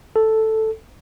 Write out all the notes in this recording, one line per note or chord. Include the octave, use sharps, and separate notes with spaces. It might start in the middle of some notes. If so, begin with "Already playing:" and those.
A4